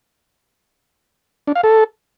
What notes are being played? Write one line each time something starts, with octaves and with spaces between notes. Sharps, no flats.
D4
F5
A4